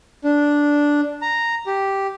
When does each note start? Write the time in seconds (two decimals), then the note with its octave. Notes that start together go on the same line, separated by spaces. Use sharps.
0.24 D4
1.22 A#5
1.66 G4